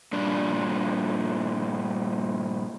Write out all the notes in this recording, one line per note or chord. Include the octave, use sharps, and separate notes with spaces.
G2 A#2 D4